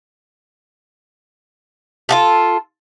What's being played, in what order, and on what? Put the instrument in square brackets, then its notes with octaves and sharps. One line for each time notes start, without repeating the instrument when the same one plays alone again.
[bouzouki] F4 F#4 A4